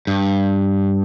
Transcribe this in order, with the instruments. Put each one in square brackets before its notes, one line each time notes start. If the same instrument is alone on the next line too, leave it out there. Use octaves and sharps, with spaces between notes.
[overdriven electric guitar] G2